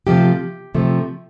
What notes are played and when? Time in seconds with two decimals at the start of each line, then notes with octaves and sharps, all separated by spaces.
0.07 C3 F3 A3 G4
0.75 C3 F3 A3